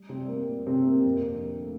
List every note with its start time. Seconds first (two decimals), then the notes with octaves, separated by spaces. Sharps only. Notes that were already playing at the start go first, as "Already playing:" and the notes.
Already playing: G3
0.09 C3 C4
0.19 G3
0.28 A#3
0.48 A#2
0.67 C3 C4
0.76 A#2
0.85 A#3
1.05 F2 A#3
1.33 D3
1.63 A3